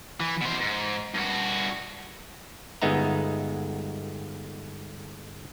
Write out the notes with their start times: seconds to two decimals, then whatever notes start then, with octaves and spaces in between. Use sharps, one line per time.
0.20 E3
0.42 B2 C5
0.61 G#2
1.14 G2 F#4
2.82 G1 G#3 B3 D#4 E5 A#5